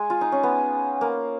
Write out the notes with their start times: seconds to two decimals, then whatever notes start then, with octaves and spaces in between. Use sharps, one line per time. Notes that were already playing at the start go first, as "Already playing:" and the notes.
Already playing: G#3 G#5
0.10 F4
0.21 D#4
0.32 C#4
0.43 B3
1.01 A#3